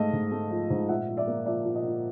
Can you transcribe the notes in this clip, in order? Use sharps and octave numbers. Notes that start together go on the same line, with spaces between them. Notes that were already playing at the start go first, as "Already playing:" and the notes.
Already playing: G#2 A3 D#5 F5
G#2
A3
F3
G#2
A#2 E5 F#5
F3
D5 E5
A#3
F3 D5 E5
A#2
D#5
A#2